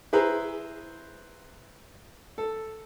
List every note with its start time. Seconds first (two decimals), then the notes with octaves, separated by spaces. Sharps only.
0.13 E4 G#4 B4 C5 A#5
2.38 A4